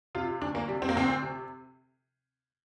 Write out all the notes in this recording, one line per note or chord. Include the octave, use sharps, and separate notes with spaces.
C3 F4
D2 D4
A#3
C3 G3
C4
A#3
D2 C4
C3